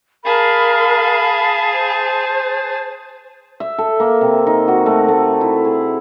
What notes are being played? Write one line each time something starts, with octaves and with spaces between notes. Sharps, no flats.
G#4 A#4 F5 A5 B5
C5
E5
A4
A#3
C3
D#4
F#4
A3
A3
E4
G#4